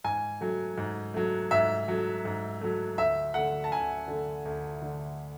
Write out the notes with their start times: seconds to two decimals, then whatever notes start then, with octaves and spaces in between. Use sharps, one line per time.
0.04 G#2 G#5
0.41 F#3 A3
0.78 G#2
1.14 F#3 A3
1.51 G#2 E5
1.88 F#3 A3
2.25 G#2
2.61 F#3 A3
2.98 D2 E5
3.34 D3 A3 F#5
3.64 A5
3.72 D2 G#5
4.08 D3 A3
4.45 D2
4.82 D3 A3